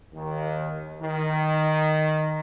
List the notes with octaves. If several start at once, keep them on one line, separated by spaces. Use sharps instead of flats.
D#2 D#3
D#3